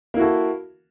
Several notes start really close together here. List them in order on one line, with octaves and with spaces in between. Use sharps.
A#3 E4 F#4 A4